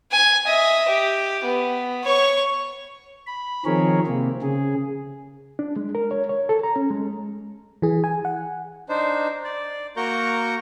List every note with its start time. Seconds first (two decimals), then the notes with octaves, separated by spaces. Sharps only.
0.11 G#5
0.46 D#5 E5
0.89 G4
1.44 B3
2.04 C#5 C#6
3.26 B5
3.65 D#3 F3 C4 G#4 A#4 C#5
4.07 C3 A#3 C4
4.42 C#3 G#4
5.59 D4
5.76 G#3
5.95 A#4
6.11 C#5
6.29 C#5
6.49 A4
6.63 A#5
6.76 C#4
6.90 G#3
7.82 E3 G#4
8.04 G#5
8.25 F#5
8.89 D4 D#4 C5
9.44 D5
9.97 A#3 F#4 A#4 A#5 C#6 G6